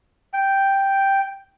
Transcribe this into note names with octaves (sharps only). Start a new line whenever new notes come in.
G5